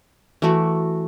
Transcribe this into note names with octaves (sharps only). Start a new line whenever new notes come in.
E3 A3 F#4